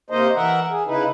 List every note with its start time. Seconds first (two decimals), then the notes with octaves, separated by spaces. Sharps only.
0.10 C3 A#3 D#4 C5 D#5
0.35 E3 A#4 E5 F#5
0.70 G#4
0.87 C#3 D#4 E4 B4